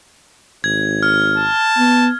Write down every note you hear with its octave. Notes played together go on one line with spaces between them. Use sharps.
G#1 G#6
F6
A5
B3